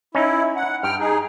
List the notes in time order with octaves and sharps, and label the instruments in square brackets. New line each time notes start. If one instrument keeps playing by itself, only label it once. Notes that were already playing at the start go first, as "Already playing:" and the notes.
[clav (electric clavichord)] C#4 D#4 [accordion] E4
[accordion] F#5
[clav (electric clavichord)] G2 [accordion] G5 F6
[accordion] D#4 G#4